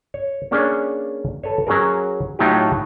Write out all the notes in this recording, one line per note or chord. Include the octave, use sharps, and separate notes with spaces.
C#5
A#3 C#4 D4 G#4 C#5 D5
A4 B4 C#5
F#3 C#4 F#4 G#4 A#4
A2 F#3 D#4 F4 G4